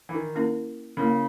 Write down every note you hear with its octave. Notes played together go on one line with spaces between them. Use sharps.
E3
D#3
A#3 C#4 E4 A#4
C#3 A#3 C#4 E4 A#4